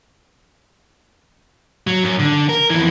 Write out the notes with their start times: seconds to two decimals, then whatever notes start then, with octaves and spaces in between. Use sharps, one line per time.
1.87 F#3
2.03 F#2
2.19 D3
2.49 A#4
2.70 F2 E3